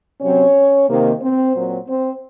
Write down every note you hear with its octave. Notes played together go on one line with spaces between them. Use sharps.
C3 F#3 C4 C#4 C#5
C3 D#3 A#3
C4 C5
A#2 F#3 C4
C4 C5